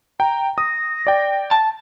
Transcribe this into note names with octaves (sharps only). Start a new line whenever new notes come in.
G5 A#5
D#6 A#6
D5 G5
A5